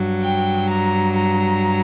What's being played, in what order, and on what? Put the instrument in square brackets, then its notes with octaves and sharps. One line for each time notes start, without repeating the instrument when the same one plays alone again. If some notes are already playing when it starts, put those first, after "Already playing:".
Already playing: [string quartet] G2 F#3
G5
A#5
A#5